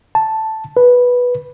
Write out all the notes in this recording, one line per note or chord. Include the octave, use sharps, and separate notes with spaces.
A5
B4